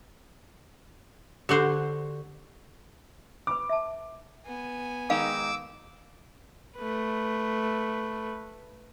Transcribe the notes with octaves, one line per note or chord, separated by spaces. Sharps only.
D3 F#4 G4 A4 C5
B4 B5 D6
E5 A5
B3 G#5
D#3 G#3 D#4 F5 D6 E6
A3 B4